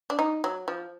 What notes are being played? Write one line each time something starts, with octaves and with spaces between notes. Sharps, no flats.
D4
D#4
F#3
F3